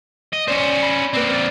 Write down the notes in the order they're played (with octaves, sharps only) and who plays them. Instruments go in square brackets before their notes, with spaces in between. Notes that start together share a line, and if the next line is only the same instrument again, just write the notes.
[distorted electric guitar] D#5
[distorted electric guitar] C#4 C5 [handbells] D5
[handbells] B5
[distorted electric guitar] A#3 C4 [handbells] B4 D5
[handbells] A6